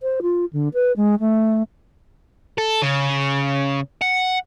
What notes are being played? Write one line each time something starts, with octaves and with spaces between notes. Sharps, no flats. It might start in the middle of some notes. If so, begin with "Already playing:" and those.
C5
F4
D3
B4
G#3
A3
A4
C#3
F#5